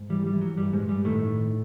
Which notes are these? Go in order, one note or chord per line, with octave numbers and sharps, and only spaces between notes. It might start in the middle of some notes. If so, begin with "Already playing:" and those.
Already playing: G#2
E3 G3
G3
E3
F#3
G2 G3
G#2 G#3
G2
G3
A2 D#3 A3
D#3